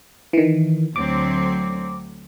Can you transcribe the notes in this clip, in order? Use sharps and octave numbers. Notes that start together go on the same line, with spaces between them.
D#3 E3
D2 F#3 C4 D6